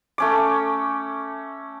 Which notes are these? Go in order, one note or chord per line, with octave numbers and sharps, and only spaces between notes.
A3 C#4 D6